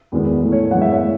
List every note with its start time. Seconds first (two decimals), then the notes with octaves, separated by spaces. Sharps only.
0.12 E2 D#3 G#3 B3
0.42 A2 E3 A3
0.52 C#5
0.71 F#2 E3 G#3 B3 F#5
0.81 E5
0.91 C#5
1.02 A2